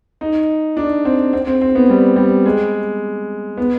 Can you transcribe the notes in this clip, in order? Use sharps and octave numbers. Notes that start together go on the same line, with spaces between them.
D#4
D4
C4
C4
C4
C4
B3
G3
G3
G#3
B3